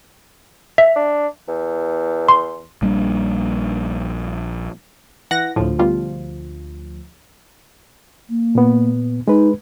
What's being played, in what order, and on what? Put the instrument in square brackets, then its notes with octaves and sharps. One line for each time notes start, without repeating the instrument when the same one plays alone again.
[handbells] E5
[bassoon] D4
E2
[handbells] C6
[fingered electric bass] A#1 G3 A#3 D4
[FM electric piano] E3 [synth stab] F#5 A#6
[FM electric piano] D2 F3 [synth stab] A2
[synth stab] B2 G3 F4
[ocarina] A#3
[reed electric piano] A#2 B3
[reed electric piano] G#3 B4 [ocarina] D#4